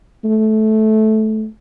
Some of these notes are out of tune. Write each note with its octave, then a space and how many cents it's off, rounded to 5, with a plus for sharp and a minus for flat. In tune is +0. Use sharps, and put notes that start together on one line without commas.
A3 -15